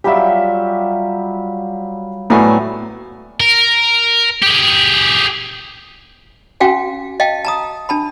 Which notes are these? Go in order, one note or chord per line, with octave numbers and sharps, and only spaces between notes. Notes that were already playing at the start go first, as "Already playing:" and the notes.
F#3 G3 F4 G4 E5
A2 F#3 G3 B3 G#5
A#4
G4 G#4
C#4 F#4 F5 G5 G#5
D#5 F5 G5 A5
A5 A#5 D#6
D4 A5 B5